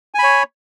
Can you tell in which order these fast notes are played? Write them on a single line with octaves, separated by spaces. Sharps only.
G#5 B5 C#5